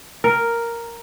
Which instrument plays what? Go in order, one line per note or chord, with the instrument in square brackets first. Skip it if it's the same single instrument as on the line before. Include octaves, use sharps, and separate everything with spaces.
[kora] A#4